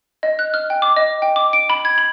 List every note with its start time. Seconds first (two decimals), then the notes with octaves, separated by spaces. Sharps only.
0.23 D#5
0.39 F#6
0.54 F6
0.70 G5
0.82 D6
0.97 D#5
1.22 G5
1.36 D6
1.53 D7
1.70 B5
1.85 G#6
1.98 B5